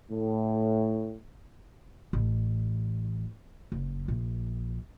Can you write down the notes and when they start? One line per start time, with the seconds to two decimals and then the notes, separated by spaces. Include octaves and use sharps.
0.11 A2
2.13 A1
3.72 F#1
4.08 A#1